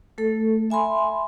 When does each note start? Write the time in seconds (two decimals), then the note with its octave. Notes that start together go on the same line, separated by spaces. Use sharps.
0.18 A3 A4
0.70 E5 G#5 B5 C6